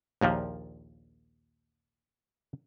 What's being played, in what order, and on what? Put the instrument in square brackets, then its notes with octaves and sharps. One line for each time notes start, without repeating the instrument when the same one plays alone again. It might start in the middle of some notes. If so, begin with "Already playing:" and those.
[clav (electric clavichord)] A#1 D#2 A#2 F3